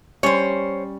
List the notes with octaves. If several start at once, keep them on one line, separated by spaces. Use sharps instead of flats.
G3 C#4 C5 C#5